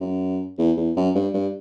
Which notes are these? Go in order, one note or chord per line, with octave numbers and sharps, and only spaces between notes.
F#2
E2
E2
F#2
G2
G2